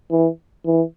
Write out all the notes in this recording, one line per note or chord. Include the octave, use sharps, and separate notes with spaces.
E3
E3